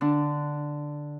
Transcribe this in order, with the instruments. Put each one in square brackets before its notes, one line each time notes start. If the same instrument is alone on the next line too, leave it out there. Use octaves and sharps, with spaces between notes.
[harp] D3 D4